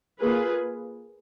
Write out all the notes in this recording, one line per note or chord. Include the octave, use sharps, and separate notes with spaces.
A#3 F4 G#4 B4